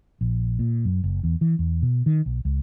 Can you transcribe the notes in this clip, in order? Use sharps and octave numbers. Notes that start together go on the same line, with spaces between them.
A#1
A#2
F#2
F#1
E2
E3
E2
B2
D#3
B1
C#2